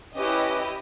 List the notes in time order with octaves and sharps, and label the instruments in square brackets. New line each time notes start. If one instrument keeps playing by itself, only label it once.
[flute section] C#4 B4 D6 [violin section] E4 G4 D#5